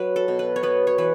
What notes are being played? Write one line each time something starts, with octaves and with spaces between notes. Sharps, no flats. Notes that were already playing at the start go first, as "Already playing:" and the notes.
Already playing: F#3 B4
A4
B2
B4
C#5
B3 B4
C#5
E3 B4